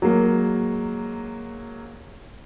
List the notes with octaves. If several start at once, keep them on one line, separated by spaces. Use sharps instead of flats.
F#3 G#3 A#3